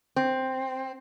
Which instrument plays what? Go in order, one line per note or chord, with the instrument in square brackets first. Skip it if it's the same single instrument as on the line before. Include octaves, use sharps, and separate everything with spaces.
[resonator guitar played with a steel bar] C4